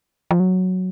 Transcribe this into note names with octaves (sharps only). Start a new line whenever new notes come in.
F3
F#3